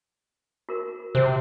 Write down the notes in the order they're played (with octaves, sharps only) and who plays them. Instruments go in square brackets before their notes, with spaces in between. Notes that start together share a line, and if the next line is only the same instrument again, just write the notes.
[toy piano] F#4 A#4
[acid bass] C3 [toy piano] C5